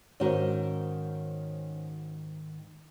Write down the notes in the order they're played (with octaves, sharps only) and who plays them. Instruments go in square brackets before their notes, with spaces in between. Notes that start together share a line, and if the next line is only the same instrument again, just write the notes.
[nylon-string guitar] G#2 D#3 [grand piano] C#4 F#4 C5